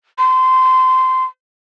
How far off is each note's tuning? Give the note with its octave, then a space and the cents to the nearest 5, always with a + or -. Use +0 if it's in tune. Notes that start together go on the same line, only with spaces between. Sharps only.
C6 -20